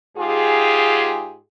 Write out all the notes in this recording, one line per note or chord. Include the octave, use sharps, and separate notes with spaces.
G#2 F4 G4 G#4